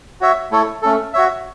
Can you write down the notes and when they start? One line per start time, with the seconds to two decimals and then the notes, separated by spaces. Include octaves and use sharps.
0.21 F#4 C#5 E5
0.51 A3 E4 A4 C#5
0.82 A3 C#4 A4
1.13 F#4 C#5 E5